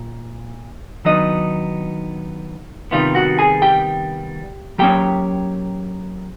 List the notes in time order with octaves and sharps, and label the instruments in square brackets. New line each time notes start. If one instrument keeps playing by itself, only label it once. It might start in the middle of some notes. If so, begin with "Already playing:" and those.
Already playing: [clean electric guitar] A#2
D#3 F#3 B3 D4 D#4 D#5
C3 D#3 G3 B3 F4 F5
F#4 F#5
G#4 G#5
G4 G5
F#3 A#3 C#4 G4 G5